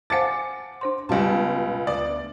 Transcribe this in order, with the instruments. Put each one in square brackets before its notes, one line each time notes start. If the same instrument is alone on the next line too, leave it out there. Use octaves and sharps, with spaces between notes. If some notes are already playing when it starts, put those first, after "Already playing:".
[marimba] C5 F5 A5 [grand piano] F#5 G#5 D6 [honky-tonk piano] A6 C#7
[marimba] D4 C5 C6
[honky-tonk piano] C#2 A5 [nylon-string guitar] B2 G3 [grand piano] B3 F4
[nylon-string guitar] D2 [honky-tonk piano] D5 [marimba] D#6